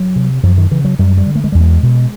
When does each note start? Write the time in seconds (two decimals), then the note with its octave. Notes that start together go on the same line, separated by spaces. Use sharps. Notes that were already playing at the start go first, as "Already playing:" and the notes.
Already playing: F#3
0.16 C3
0.43 F#2 F3
0.58 D#3
0.71 C#3 E3
0.85 F#3
0.99 F#2 G3
1.17 G3
1.26 D3
1.35 A3
1.44 G#3
1.52 E2 G3
1.60 G#3
1.83 B2